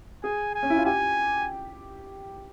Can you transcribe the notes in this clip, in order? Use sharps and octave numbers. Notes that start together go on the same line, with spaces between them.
G#4 G#5
G#5
C#4
E4
F4
G4 G#5